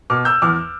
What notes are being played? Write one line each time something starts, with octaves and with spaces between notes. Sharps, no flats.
B2 D6 F6
E6 G6
E2 D6 F6